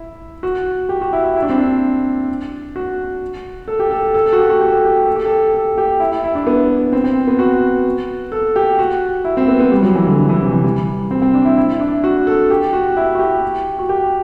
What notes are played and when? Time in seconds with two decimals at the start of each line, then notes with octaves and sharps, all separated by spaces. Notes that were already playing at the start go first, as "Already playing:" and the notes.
Already playing: E4
0.43 F#4
0.89 G4
1.01 F#4
1.13 E4
1.24 E4
1.36 E4
1.42 D4
1.49 C4
1.58 D4
2.76 F#4
3.68 A4
3.79 G4
3.91 A4
4.14 A4
4.26 A4
4.33 F#4
4.38 G4
4.50 F#4
4.61 G4
4.72 A4
4.85 G4
5.06 A4
5.15 G4
5.25 A4
5.54 A4
5.78 G4
6.00 E4
6.12 E4
6.24 E4
6.35 D4
6.47 B3
6.93 C4
7.04 C4
7.27 B3
7.39 F#4
8.32 A4
8.56 G4
8.79 F#4
9.25 E4
9.37 C4
9.48 B3
9.59 B3
9.72 G3
9.83 F#3
9.95 E3
10.07 D3
10.19 D3
10.29 E3
10.42 C3
10.53 E3
10.64 G3
11.11 C4
11.22 C4
11.34 D4
11.45 E4
11.57 E4
11.73 E4
11.80 D4
12.04 F#4
12.27 A4
12.50 G4
12.73 F#4
12.97 E4
13.15 F#4
13.19 G4
13.79 F#4
13.89 G4